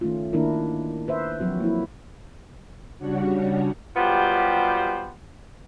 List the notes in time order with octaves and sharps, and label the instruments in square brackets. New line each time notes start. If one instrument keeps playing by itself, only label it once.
[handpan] D#3 A3 C#4 F4
D#3 A#3 D4 E4 A#4
B4 C5 E5
F3 F#3 C4 F#4
A#3 E4
[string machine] C#3 G3 D4 F#4 C#5 F#5
[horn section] F#3 G3 B3 F4 G4 C5